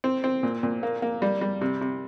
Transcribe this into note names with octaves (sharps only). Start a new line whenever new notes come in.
C4
C4
A#2
A#2
A#3
A#3
G3
G3
C3
C3